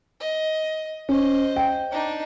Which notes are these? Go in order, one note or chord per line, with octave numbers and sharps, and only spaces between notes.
D#5
C#4 C5 D#5
G5
D4 D#4